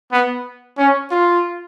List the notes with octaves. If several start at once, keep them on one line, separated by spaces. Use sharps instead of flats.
B3
C#4
F4